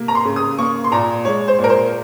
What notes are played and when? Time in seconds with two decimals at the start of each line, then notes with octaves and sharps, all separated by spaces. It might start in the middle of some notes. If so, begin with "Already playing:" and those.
Already playing: C3 A#3
0.08 A#5
0.15 C6
0.25 C#3
0.36 D#6
0.58 A#3 C#6
0.84 C6
0.92 A#2 A#5
1.25 G#3 C#5
1.48 C5
1.59 A#2
1.64 A#4
1.70 C5